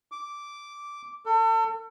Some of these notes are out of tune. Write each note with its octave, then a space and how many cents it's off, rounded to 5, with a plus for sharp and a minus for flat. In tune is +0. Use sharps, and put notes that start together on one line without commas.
D6 -10
A4 +35